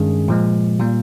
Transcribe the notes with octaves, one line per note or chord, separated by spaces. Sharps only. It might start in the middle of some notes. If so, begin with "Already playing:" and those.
Already playing: G2 D#3 G#3 C#4 G#4
A#2 F3 G#3
A#2 G3 A#3